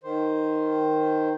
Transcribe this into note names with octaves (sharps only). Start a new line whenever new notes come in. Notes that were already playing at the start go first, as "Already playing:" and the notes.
D#3 C5